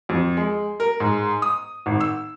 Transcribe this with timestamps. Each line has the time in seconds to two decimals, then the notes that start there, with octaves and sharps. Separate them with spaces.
0.09 F2
0.37 G#3
0.80 A#4
1.00 G#2
1.42 D#6
1.86 G#1
2.01 E6